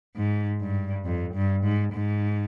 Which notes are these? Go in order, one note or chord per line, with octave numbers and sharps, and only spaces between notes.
G#2
G2
F2
G2
G#2
G#2